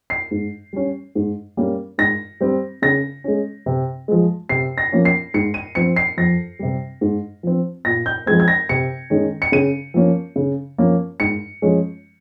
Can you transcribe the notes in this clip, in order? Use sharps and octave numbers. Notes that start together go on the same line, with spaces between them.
C7
G#2
G3 C#4
G#2
G3 A#3 C#4
G#2 A#6
G3 C4
C#3 A#6
G#3 C#4
C3
F3 G#3
C3 C7
A#6
F3 A#3 C#4
C7
G#2 C#7
D#7
F3 C4 C#7
C7
F2 A#6
C3 G3
G#2
F3 C4
A#2 A#6
G6
F3 G#3 C4 G#6
G#6
A#6
C3 C#7
D#3 G#3 C#4
C#7
C#3 D#7
F3 A#3 C#4
C#3
F3 A#3 C#4
G#2 C#7
F3 G#3 C#4